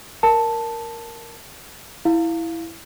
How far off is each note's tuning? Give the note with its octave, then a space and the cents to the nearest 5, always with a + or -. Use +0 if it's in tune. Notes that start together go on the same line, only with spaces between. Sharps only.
A#4 +0 A5 +0
E4 +0 F5 +0